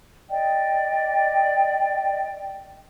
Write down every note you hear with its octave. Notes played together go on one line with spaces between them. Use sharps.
D5 D#5 G5